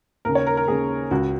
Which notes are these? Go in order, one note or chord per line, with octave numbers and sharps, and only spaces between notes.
D#2 C#3 A#4
C#5
A#4
A#4
D#2 C#3 G#4
C#2 C#3 F#4